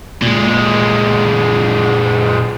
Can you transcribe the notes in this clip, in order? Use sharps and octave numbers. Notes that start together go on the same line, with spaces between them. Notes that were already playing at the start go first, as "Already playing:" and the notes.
A#2 G#3